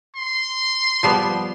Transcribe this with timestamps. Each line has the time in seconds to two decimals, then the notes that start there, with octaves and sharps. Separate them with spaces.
0.16 C6
1.03 F3 G3 B3